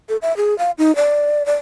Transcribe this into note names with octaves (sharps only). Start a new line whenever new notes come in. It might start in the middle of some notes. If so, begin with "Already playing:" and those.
A4
E5
G#4
F5
D#4
D5
D5